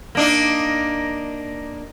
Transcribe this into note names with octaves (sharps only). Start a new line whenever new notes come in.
A#3 D4 D#4